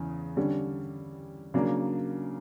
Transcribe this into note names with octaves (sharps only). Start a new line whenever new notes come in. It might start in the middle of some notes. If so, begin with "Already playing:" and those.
Already playing: E2 C#3
D3 G3 C#4
C#3 F#3 A#3 D4